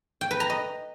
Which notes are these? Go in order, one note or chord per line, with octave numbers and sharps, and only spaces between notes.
G5
B4
A#5
D#5